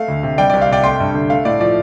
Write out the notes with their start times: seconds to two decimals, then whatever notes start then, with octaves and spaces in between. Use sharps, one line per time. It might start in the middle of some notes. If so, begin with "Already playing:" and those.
Already playing: A3 F5
0.08 D2
0.23 C3
0.38 G3 D5 G5
0.50 C2 D5
0.62 F5
0.68 C3 D5 G5
0.84 A3 G5 C6
1.00 G2
1.14 D3
1.30 A3 F5
1.45 A2 D5
1.60 F3 D5